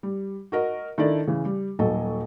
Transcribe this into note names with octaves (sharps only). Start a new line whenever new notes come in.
G3
F#4 A#4 D#5
D#3 D4 E4 A4 D5
C#3 E3
G3
D#1 F#3 A4 D#5